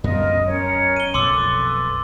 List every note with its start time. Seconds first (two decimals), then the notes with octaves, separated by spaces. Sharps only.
0.04 F#2 B3 F4 A#4 D#5
0.45 C#4 A#4 C#5
0.96 D#7 G7
1.14 B1 F2 A4 B4 C6 D6 E6